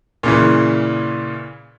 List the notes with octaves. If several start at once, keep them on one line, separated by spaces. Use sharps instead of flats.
A#2 C#3 E3